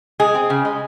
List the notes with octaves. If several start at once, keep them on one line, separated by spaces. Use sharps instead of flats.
G#3 G#4
C4
C#3
G#3